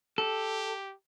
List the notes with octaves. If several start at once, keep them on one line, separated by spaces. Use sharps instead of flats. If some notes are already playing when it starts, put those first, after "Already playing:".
G4 A4